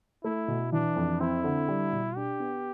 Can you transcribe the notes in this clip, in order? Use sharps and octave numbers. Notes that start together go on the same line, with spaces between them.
A3 E4
B2
E3 D4
F2
C4 E4
D3
G3
B2
D4 G4
B3